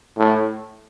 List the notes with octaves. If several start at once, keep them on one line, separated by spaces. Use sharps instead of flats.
A2